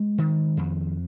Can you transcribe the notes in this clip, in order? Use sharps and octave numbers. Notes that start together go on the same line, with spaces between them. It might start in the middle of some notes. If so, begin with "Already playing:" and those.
Already playing: G#3
D#3
F2